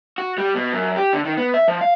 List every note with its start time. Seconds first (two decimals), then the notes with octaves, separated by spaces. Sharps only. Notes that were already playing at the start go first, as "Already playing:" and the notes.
0.18 F#4
0.38 G3
0.55 B2
0.73 F#2
0.96 G4
1.13 D3
1.25 D#3
1.38 B3
1.54 E5
1.68 F3
1.81 F5